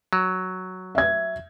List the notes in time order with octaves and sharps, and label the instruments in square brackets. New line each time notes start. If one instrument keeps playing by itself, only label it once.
[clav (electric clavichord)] F#3
[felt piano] E5 G#6